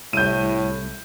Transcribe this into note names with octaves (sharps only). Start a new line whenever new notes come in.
C2 A2 G6 D#7